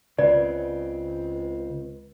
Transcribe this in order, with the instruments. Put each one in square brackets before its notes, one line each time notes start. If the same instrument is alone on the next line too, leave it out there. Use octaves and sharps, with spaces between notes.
[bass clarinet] C#2 [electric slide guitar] C#3 C4 [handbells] B4 [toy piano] D5